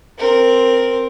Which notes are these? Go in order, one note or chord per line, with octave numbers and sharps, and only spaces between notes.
C4 A#4